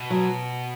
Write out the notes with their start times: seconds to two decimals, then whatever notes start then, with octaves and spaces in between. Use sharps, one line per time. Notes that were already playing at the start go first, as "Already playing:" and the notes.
Already playing: B2
0.10 F#3